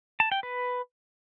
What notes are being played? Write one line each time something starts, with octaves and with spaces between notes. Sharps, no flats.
A5
G5
B4